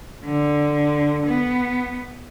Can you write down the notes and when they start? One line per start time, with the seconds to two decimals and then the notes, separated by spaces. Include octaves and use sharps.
0.25 D3
1.26 B3